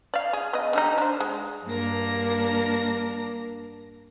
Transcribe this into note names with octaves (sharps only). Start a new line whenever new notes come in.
D5 F5
G#4
B3 D#5
D3 G3 D#4
D4 C5
G#3
G2 A#3 D4 A#4 A#6